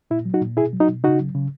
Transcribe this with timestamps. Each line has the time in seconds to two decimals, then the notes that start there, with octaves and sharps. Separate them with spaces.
0.11 A#2 E4
0.25 F#3
0.34 D#4 F#4
0.41 A#2
0.57 B2 E4 G#4
0.73 F#3
0.80 D#4 F#4
0.88 B2
1.04 C#3 D#4 F#4
1.20 F#3
1.35 C#3